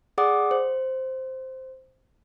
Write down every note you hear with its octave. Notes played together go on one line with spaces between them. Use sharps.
G#4 D5 F#5 D6 D#6
C5